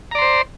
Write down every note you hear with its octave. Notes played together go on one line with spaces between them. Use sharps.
C5 D5 A#5 C6